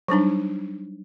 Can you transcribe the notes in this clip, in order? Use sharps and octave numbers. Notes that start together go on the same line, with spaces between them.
F#3 G3 D4 D#4